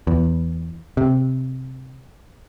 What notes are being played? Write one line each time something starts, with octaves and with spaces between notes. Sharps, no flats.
E2
C3